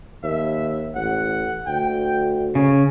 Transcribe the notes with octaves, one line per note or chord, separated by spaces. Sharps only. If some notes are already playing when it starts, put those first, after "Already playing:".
D#2 E5
A1 F#5
D2 G5
C#3 C#5